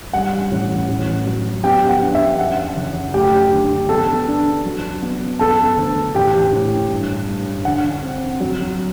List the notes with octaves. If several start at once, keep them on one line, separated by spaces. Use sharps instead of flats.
G3 F#5
A1
A1
F#3
B3 G4 G5
F#5
D4
E5
F#2 F#5
F#1
A3 G4 G5
D3
B3 A4 A5
D4
F#3
B3
B3 A4 A5
D2
A1 G4 G5
A2
G2
G2
D3 F#5
C4
F#3